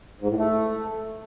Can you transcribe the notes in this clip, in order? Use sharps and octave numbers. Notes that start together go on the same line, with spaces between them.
G#2
A2
A3